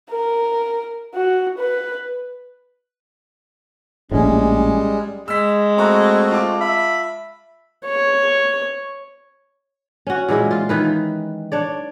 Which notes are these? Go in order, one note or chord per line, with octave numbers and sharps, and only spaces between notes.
A#4
F#4
B4
A#1 A2 G3 G#3 C#4
G#3 E6 B6
A3 C4 F#4 A#5 C#6
F4 A5 D6
E5 B5
C#5
C#4 F#4
A#2 E3 G#3 E4
F4
D#3 E3 B4
D4 C#5 D5